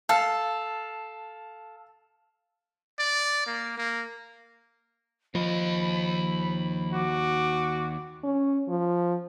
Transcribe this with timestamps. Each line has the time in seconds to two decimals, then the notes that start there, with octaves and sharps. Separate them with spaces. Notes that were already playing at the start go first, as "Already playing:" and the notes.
0.09 A4 F5 A5 F6
2.99 D5
3.47 A#3
3.78 A#3
5.35 D#2 F3 D#5 B5
6.93 F#4 D6
8.24 C#4
8.69 F3